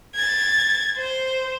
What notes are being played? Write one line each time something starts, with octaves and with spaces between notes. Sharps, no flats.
G#6 A6
C5